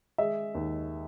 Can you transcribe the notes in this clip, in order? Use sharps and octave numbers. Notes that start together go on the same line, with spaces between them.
G#3 E5
D#2